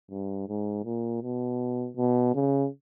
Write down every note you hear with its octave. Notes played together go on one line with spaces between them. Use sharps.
G2
G#2
A#2
B2
B2
C#3